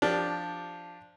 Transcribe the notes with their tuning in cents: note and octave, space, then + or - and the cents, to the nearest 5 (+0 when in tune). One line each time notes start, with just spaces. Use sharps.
F3 +0 D4 +0 G4 +0